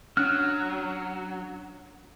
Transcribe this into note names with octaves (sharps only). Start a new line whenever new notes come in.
F#3 C#4 D4 F6 F#6